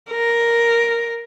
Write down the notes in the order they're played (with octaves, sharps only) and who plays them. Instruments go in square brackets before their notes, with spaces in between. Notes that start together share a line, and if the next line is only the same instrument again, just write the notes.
[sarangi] A#4